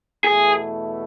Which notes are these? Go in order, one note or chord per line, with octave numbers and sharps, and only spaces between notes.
E2 B2 A3 E4 G#4